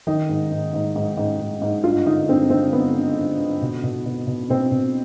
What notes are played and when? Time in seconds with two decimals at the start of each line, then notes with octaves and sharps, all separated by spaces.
0.07 D#3 D#4
0.29 G#2
0.51 G#2
0.74 G#2
0.96 G#2
1.17 G#2
1.40 G#2
1.62 G#2
1.84 G2 F4
2.06 D3 D#4
2.28 G2 C4
2.50 D3 C4
2.73 D3 B3
2.95 D3
3.17 D3
3.39 D3
3.62 B2
3.83 B2
4.05 B2
4.27 B2
4.50 B2 C4
4.71 B2